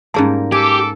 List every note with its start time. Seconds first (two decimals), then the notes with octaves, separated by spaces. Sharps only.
0.14 G#2 G3 A#3 C#4 G#4 A5
0.52 G4 A4 G#5 D6